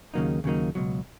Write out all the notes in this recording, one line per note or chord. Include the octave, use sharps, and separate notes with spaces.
D#2 C#3 F#3 A#3 D#4
D#2 C#3 F#3 A#3 D#4
C#2 B2 F#3